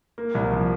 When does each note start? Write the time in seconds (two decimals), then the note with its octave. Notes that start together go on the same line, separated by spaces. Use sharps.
0.18 A#3
0.35 C2
0.52 F3